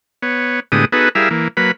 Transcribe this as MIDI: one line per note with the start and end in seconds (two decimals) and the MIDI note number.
0.22 0.60 59
0.22 0.60 73
0.72 0.85 45
0.72 0.85 50
0.72 0.85 56
0.72 0.85 59
0.72 0.85 67
0.72 0.85 87
0.92 1.09 59
0.92 1.09 63
0.92 1.09 66
0.92 1.09 68
0.92 1.09 69
0.92 1.09 71
1.15 1.29 55
1.15 1.29 64
1.15 1.29 68
1.15 1.29 70
1.15 1.29 76
1.15 1.29 77
1.31 1.48 52
1.31 1.48 58
1.57 1.72 54
1.57 1.72 58
1.57 1.72 71
1.57 1.72 83